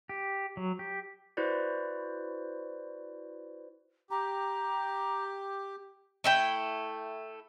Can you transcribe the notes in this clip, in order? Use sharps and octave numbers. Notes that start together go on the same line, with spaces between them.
G4
F#3
G4
E4 F#4 B4 C5 D5
G4 A#5
A3 E4 G5